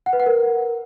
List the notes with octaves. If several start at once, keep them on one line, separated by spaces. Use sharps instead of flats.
F#5
B4
F#5
A#4